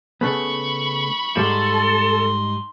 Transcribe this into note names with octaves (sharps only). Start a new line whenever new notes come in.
C#3 A3 B3 B5 C#6
G#2 G3 D#4 A4 C6